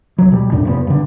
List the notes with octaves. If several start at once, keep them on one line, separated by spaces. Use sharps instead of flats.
C#2 F#3
B2 G3
C2 F#2 A2 D4
F1 A#2 B3
G2 D3